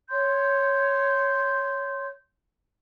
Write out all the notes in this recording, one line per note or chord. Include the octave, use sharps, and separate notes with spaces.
C#5 C6 G6